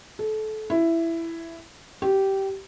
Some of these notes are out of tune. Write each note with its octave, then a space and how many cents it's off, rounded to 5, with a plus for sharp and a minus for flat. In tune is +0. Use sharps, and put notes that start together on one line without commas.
A4 -25
E4 +10
G4 -15